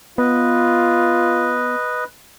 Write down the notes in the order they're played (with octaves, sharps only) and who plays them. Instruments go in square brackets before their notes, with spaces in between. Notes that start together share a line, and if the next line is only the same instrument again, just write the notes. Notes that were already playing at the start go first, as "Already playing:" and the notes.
[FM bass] B3 [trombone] F4 [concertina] B4 D#5